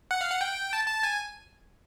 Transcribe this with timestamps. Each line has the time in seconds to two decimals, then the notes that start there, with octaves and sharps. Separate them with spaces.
0.11 F#5
0.21 F5
0.31 F#5
0.41 G5
0.73 A5
0.87 A5
1.03 G#5